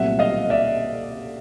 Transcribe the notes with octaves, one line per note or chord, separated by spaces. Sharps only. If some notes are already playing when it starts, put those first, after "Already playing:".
Already playing: C2 A#2 F#3 A3 C4 E5 F#5
D#5 F5
D5 E5